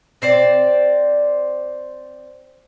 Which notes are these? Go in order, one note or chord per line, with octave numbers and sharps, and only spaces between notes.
C4 C5 D5